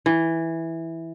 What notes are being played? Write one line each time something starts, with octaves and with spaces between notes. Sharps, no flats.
E3